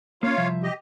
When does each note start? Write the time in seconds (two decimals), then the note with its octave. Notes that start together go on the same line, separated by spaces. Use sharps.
0.23 A#3 C#4 F4 C#5 F5
0.37 C2 F3 E5
0.63 G4 D#5